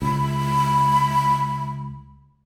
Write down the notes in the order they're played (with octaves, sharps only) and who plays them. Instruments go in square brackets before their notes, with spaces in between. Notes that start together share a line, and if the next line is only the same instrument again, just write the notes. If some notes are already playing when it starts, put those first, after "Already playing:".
[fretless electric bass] C#2 [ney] B5